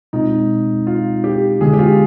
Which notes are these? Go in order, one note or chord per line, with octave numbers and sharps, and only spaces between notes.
B2 G#3 C4 D#4 F4
F4
G4
D3 G#3 B3 G#4
G4
F4